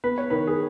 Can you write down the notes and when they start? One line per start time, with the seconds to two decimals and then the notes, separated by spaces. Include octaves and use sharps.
0.04 B3 B4
0.18 C#5
0.30 D#3 B4
0.47 G#4